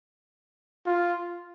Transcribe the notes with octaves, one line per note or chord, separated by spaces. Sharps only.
F4